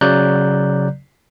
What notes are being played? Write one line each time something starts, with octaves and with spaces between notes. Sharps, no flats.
C#3 F#3 D5 A#5 F#6 G6